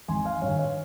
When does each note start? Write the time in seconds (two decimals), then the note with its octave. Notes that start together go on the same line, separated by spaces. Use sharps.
0.08 G#1 G#5 C6
0.25 F5 G#5
0.41 G2 D#3 C#5 F5
0.58 C#5 F5